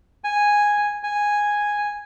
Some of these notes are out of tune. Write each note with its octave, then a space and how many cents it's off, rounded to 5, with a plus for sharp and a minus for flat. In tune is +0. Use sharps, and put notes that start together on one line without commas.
G#5 -5
G#5 -5